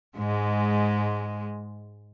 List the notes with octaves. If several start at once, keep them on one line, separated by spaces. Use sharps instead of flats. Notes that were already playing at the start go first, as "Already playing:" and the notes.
G#2 G#3